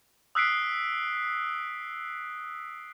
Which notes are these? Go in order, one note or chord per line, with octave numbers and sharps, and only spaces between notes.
D#6 E6 F#6 B6 C7 D7